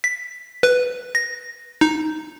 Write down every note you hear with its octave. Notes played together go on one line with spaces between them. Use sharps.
B6
B4
A#6
D#4